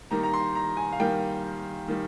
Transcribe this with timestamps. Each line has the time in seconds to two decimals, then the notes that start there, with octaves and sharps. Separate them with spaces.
0.11 D#3 G3 A#3 A#5
0.23 A#5
0.34 C6
0.55 A#5
0.77 G#5
0.92 F5
1.00 D#3 G3 A#3 G5
1.88 D#3 G3